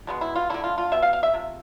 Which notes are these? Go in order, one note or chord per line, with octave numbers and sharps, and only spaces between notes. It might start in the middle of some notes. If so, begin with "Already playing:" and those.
B2 G#3 B3
E4
F4
D3 A3 E4
F4
F4
B2 B3 E5
F5
F5
E5
C3 F3